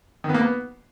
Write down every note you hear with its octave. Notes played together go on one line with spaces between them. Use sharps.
D#3
B3
A#3
B3